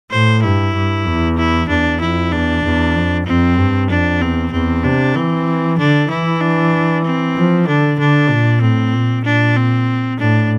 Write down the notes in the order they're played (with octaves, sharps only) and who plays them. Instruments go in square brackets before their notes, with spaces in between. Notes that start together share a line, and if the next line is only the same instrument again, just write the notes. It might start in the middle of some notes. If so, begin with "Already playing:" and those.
[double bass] A2 [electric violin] C5
[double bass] G2 [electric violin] E4
[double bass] G2
E2
[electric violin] E4
[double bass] E2 [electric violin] D4
[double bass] F2 [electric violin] E4
[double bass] E2 [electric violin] D4
[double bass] E2
F2
[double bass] F2 [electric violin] C4
[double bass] G2
[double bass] F2 [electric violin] D4
[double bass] E2 [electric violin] C4
[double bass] E2 [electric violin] C4
[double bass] C3 [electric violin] D4
[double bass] E3 [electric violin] C4
[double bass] D3 [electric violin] D4
[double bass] E3 [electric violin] E4
[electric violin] D4
C4
[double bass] F3
[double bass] D3 [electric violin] D4
[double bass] D3 [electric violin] D4
[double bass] A#2
[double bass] A2 [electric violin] C4
[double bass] A#2
[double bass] A#2 [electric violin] D4
[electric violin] C4
[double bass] A2 [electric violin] D4